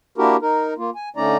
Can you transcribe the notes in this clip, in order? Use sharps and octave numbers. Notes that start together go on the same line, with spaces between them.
A#3 D4 E4 F#4 G4 A#4
D#4 A#4
A#3 F4
G#5
D3 A3 C#4 D#4 D5 A#5